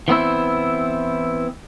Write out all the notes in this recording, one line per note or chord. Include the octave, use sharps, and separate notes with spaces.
E3 B3 C4 E4